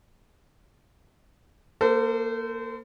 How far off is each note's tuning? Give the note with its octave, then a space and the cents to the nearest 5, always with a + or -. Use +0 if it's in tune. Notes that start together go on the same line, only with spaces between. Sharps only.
A#3 +0 A4 +35 C5 -30